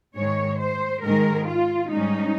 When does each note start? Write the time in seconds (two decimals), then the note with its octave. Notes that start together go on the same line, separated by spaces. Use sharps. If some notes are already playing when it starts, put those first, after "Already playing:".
0.16 G#2 D#3 G#3 C#5
0.60 C5
1.03 G#2 D#3 G#3 A#4
1.47 F4
1.91 G#2 G3 C#4 D#4